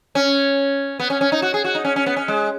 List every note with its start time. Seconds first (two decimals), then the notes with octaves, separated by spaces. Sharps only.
0.15 C#4
1.00 B3
1.10 C#4
1.21 C#4
1.32 D#4
1.42 F#4
1.54 G#4
1.64 F#4
1.75 D#4
1.85 C#4
1.96 C#4
2.06 B3
2.17 C#4
2.28 G#3